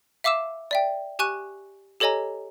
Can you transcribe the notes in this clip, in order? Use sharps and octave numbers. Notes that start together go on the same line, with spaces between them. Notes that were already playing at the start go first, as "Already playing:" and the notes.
E5 F5 D6 E6 E7
D5 E5 G5
G4 G#5 C#6 F#6 D#7
G4 A4 C#5 D#5 G#5 A#5